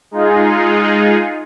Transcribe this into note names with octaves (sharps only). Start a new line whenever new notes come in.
G#3 D#4 F4 G#4